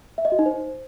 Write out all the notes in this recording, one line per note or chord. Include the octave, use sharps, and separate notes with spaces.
E5
D#5
F#4
D#4
C5